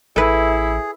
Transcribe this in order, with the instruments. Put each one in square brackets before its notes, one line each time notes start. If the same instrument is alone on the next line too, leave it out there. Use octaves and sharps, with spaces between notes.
[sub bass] A1 [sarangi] E4 [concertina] G#4 [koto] A4 B4